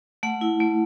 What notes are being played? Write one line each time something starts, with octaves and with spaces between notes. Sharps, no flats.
A3 F#5
E4
A3